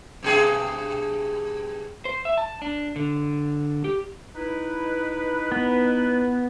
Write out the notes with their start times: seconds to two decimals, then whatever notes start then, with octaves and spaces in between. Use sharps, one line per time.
0.23 G2 B2 G#4
2.05 C5
2.25 E5
2.37 A5
2.62 D4
2.96 D3
3.84 G4
4.35 D#4 E4 B4
5.52 B3